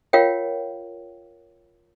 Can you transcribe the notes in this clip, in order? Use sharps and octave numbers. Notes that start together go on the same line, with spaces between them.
F4 A#4 C#5 F5 G5